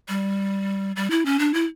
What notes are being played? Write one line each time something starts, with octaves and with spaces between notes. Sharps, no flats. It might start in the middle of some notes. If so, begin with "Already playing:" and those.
G3
G3
E4
C#4
D4
E4